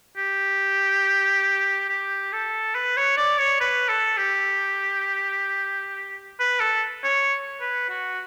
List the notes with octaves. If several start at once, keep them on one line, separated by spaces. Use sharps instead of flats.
G4
G4
A4
B4
C#5
D5
C#5
B4
A4
G4
B4
A4
C#5
B4
F#4